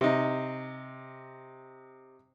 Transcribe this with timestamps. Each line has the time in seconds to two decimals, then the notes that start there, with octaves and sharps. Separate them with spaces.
0.01 C3 D#4